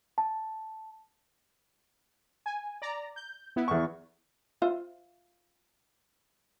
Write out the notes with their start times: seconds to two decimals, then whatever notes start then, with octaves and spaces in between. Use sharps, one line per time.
0.18 A5
2.46 G#5
2.82 D5 A#5
3.16 G6
3.56 B3 E4
3.68 E2 C#6
4.62 F4 C5 E5